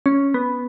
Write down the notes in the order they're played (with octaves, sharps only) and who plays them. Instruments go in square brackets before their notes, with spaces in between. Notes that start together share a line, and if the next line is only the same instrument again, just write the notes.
[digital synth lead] C#4
B3